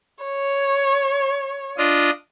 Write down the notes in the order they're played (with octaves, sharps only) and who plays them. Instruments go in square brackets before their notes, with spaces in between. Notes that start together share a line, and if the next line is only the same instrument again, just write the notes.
[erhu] C#5
[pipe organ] D4 F4 D#5